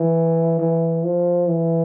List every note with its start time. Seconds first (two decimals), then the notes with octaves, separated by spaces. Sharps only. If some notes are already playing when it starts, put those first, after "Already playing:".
Already playing: E3
0.60 E3
1.05 F3
1.49 E3